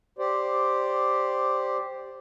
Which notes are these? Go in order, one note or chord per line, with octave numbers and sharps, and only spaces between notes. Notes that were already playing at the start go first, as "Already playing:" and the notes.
G4 C5 D5